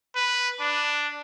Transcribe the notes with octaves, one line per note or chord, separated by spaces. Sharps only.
B4
D4